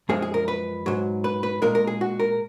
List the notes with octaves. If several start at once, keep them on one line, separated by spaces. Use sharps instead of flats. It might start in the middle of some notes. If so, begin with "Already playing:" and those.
F#2 F3 G#3 G#4
G#4
A#4
B4
G#2 F#3
B4
B4
A#2 G#3 A#4
A#4
G#4
F#4
A#4